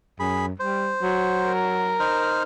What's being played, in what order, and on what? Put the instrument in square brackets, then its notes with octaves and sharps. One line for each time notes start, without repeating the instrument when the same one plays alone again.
[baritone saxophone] F#2 [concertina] G#4 B5
[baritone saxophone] G3 [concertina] C5
[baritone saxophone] F#3
[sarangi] A#4
[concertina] D#4 C5 F6